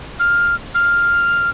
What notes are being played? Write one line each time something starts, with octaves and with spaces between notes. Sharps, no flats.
F6
F6